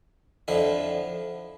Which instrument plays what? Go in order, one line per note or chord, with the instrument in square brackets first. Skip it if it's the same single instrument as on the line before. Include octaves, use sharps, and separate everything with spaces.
[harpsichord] F2 D3 F3 E4